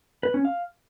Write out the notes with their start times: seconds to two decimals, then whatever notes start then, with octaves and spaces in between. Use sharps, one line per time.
0.23 B4
0.34 C#4
0.45 F5